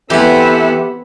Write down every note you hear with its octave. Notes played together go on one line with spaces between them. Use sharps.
E3 B3 C4 E4 G4 A4 E5